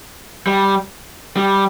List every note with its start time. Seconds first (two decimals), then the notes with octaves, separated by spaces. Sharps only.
0.47 G3
1.37 G3